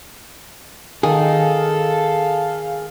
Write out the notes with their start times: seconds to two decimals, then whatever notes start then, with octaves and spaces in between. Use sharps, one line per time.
1.03 D#3 G#4 A4 F5